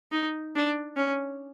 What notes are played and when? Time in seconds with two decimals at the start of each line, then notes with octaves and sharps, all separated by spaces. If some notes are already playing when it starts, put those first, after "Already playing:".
0.12 D#4
0.55 D4
0.97 C#4